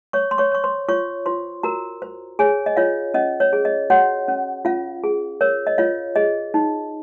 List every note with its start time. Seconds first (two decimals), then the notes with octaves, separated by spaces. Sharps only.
0.13 C#5 C#6
0.31 C6
0.38 C#5 C#6
0.52 C#5 C#6
0.64 C5 C6
0.89 F4 C#5 C#6
1.26 F4 C5 C6
1.63 F#4 A#4 A#5
2.02 C5
2.39 G#4 C#5 G#5
2.66 D#5
2.77 F4 C#5 F5
3.14 C#4 D#5
3.40 C#5
3.53 G#4
3.65 D#5
3.90 F#4 C#5 F#5
4.28 C#4
4.65 C#4 F4 F5
5.04 G#4
5.41 A#4 C#5
5.67 D#5
5.78 F4 C#5 F5
6.16 G#4 D#5
6.54 D#4